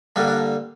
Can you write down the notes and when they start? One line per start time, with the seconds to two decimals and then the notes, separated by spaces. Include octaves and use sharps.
0.16 G2 D3 G3 A#3 D4
0.28 D4